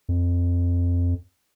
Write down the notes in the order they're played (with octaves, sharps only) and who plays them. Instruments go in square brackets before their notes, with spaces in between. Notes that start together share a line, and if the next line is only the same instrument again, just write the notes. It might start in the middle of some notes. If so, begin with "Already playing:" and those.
[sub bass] F2